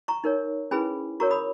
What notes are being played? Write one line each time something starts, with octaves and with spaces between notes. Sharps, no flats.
A#5 C#6
D#4 A#4 C#5
C#4 E4 G#4 B4 G#5 B5
F#4 A#4 C#5 A#5 C#6
B5 D#6